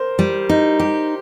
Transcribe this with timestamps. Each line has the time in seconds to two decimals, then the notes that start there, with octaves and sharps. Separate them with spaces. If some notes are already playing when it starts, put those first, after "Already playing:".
Already playing: A#4 C5
0.19 G3
0.49 D#4
0.80 G4